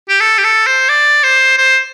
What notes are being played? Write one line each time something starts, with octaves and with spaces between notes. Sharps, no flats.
G4
A4
G4
A4
C5
D5
C5
C5